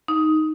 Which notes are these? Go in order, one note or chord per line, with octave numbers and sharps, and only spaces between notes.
D#4